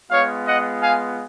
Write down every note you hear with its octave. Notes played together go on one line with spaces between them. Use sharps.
G#3 B3 F4 C#5 F5
D#5 F#5
F5 G#5